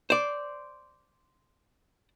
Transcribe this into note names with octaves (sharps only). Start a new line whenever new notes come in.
C5 D5